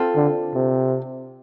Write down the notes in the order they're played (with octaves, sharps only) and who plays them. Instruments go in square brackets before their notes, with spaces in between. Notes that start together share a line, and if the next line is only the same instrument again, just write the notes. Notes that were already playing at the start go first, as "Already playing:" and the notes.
Already playing: [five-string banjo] C4 F4 A4
[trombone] D3
C3